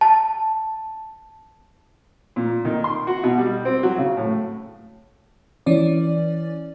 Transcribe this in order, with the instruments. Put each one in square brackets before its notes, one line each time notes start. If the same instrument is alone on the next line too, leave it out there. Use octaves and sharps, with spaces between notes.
[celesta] A5
[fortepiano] A#2
D#3
C6
F#4
B2
G3
C4
F#3
C#3
A2
[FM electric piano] E3 C#4 D5